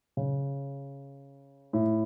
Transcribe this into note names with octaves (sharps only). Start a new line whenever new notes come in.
C#3
A2